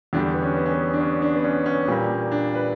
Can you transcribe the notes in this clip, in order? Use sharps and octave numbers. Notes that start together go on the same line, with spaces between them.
E2 D3 G3 D4
B3
C#4
B3
C#4
B3
D4
C#4
D4
B3
C#4
C#4
A#2 G3 A#3
D4
B4